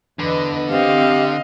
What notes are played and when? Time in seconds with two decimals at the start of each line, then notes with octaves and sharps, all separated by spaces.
0.19 E2 D3 B4 D#5
0.71 C4 G4 D#5 F5